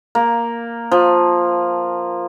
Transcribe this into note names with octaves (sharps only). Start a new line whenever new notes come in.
A#3
F3